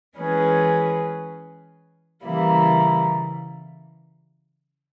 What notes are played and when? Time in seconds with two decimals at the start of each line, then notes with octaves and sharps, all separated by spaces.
0.16 E3 G#3 C#4 G#4 B4
2.24 C#3 E3 G3 A#3 E4